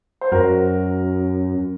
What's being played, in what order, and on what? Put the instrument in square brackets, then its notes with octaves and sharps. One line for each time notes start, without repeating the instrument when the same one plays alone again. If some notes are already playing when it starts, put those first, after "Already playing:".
[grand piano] C5
[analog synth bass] F#2 [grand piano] F#4 A#4